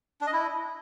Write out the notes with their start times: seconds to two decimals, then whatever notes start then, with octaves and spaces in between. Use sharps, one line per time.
0.21 D4
0.27 D#5
0.33 E4